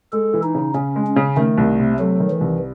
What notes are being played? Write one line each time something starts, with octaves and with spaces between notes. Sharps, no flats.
G#3 A4
E3
D#4
C#3
C#3 C#4
G#3
C#4
C#3
D#3 A3
C2
C3
F#3 A3
D#3
E3
C2